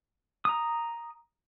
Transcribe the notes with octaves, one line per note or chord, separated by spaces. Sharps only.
A#5 D#6